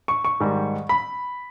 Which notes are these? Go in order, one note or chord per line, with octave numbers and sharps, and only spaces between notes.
C#6
C#6
G#2 D#3 G3
B5